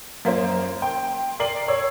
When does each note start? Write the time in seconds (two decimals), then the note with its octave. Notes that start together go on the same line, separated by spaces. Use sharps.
0.25 F#2 A#3 F4 C5
0.82 G5 C6
1.39 A#4 D5 C7 F#7
1.68 C#5 D5 E6